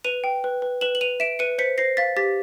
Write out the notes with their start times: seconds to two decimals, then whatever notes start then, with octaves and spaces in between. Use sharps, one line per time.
0.04 B4 D#7 F7
0.24 G5
0.44 B4
0.62 B4
0.81 B4 E7 F#7
0.95 F#7
1.01 B4 D#7 F7
1.20 E5 D7 E7
1.39 B4 C#7 D#7
1.58 C5 B6 C#7
1.78 C5 A#6 C7
1.97 F5 A6 B6
2.17 G4 A6 B6